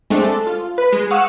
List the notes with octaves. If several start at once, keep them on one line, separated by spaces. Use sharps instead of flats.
G#3 A3 C4 D4
A4
F4
B4
G#3
F5 F#5 C#6 D#6 E6